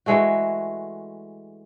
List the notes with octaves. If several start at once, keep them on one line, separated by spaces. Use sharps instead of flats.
E3 G#3 A3 F#4